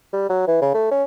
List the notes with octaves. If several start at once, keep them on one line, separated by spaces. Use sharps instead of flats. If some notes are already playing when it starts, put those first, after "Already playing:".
G3
F#3
E3
C#3
A3
C#4